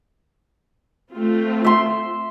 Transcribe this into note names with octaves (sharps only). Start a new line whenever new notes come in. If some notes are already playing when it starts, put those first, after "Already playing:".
A3 C4 F4
E5 C6